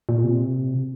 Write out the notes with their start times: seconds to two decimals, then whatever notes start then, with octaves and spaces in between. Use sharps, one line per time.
0.09 A#2
0.24 C3